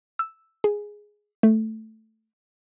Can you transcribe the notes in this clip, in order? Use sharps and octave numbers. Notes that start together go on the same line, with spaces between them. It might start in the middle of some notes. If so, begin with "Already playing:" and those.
E6
G#4
A3